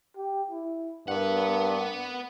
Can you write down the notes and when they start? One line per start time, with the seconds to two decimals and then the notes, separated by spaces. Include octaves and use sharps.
0.17 G4
0.50 E4
1.08 G2 B3 A#4 F#5